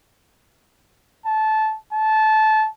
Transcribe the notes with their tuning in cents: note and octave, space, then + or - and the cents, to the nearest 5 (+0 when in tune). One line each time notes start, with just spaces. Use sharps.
A5 -15
A5 -20